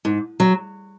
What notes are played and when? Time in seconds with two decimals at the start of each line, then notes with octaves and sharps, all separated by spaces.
0.05 G#2
0.40 F#3